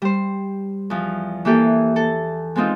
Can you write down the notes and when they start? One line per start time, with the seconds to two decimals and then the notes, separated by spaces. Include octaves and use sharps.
0.02 G3 C5
0.90 E2 F3
1.45 E3 A#3 E4 G4 A4
1.96 A4
2.55 G#3 B3 C4 D#4 F4